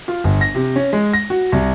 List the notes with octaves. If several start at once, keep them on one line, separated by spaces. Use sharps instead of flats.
F4
G1
A#6
C3
C#4
G#3
A#6
F#4
C2